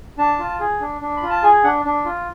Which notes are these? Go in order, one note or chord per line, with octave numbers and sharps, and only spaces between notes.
D4 A5
F4
G#4
D4
D4
B5
F4
A5
G#4 G#5
D4 F#5
D4
F4